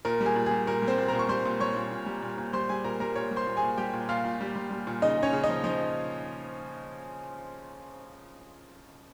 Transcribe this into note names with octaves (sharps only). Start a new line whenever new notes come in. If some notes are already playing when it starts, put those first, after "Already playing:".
A#2 A#4
G3
G#4
A#2
G#4
G3
A#2 A#4
G3
C4 C5
A#2
A#2 A#4 A#5
C#6
G3 C5 C6
A#2
G3 C#5 C#6
A#2
A#2
G3
A#2
A#2
G3 C5 C6
G3 G#4 G#5
A#2 A#4 A#5
G3 A#4 A#5
A#2 C#5 C#6
G3
C5 C6
A#2
G#4 G#5
A#2
G3 G4 G5
A#2
A#2 F4 F5
A#2
G3
G3
G3
A#2
C#3 D#4 D#5
C#3
C#4 C#5
C#3
D#4 D#5
F3
F3 D#4 D#5